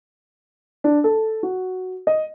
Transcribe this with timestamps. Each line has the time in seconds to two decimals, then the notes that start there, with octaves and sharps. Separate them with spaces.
0.84 D4
1.04 A4
1.43 F#4
2.07 D#5